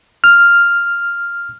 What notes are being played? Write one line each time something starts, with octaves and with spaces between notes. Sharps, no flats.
F6